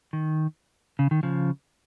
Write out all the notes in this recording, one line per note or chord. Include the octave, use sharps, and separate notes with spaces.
D#3
C#3
D#3
C#3 F3